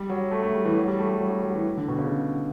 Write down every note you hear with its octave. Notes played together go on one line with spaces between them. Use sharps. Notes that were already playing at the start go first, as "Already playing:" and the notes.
Already playing: G3
F#3
A3
A3
G3
E3
F#3
G3
A3
G3
F#3
G3
F#3
E3
D3
B2
C#3